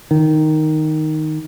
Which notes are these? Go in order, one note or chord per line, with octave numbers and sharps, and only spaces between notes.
D#3